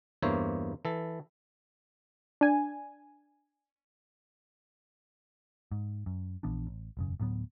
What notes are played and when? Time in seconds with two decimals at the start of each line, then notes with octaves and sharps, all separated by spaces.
0.22 E2 G2 A#3 C5 C#5 E5
0.85 E3 A4
2.41 D4 G#5
5.72 G#2
6.06 F#2
6.43 A#1 E3 B3 D4
6.67 A1
6.97 E1 F#2 C#3
7.20 D2 A2 F#3 B3